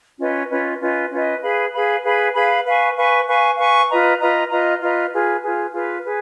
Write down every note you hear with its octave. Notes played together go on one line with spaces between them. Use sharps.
C#4 F4 B4 D#5
C#4 F4 B4 D#5
C#4 F4 B4 D#5
C#4 F4 B4 D#5
G#4 B4 F5 B5
G#4 B4 F5 B5
G#4 B4 F5 B5
G#4 B4 F5 B5
B4 F5 G#5 C#6
B4 F5 G#5 C#6
B4 F5 G#5 C#6
B4 F5 G#5 C#6
F4 B4 D#5 A#5
F4 B4 D#5 A#5
F4 B4 D#5 A#5
F4 B4 D#5 A#5
F4 G#4 B4
F4 G#4 B4
F4 G#4 B4
G#4 B4